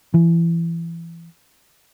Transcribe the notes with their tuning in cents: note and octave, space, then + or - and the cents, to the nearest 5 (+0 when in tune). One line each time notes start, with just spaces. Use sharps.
E3 +25